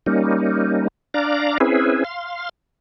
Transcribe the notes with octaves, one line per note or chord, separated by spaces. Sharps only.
G3 A#3 C#4 D#4
D4 D5 F5 A#5
C4 C#4 E4 G#4 B4
F5 C6